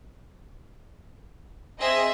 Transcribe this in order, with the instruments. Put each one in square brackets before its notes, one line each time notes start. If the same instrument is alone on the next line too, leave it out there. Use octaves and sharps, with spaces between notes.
[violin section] C4 G#4 D#5 [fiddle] E5 C6